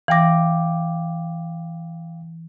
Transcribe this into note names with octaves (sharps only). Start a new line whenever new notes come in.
E3 F5 G5 D6 A#6